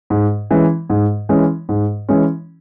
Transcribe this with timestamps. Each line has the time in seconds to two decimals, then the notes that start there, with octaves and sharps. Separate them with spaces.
0.10 G#2
0.51 E3 G#3 C#4
0.90 G#2
1.29 E3 G#3 C#4
1.69 G#2
2.09 E3 G#3 C#4